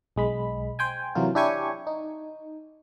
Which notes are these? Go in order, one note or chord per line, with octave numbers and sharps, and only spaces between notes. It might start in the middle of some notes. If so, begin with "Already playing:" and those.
B1 G#3 B5
C5 G5 G#5
C3 E3 F#3 A#3 F4
D4 E4 G4 C#5 G#5 C#6
D#4